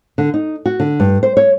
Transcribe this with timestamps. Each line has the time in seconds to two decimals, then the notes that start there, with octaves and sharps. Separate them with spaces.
0.18 D3
0.34 D#4
0.66 F#4
0.80 D3
1.00 G2
1.23 C5
1.37 C#5